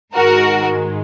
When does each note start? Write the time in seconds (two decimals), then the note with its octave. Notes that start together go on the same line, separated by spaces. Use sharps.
0.14 G#2 D#3 G#3 F#4 A#4